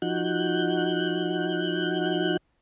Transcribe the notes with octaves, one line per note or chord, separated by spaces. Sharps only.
F3 D#4 F#4 F#6 G6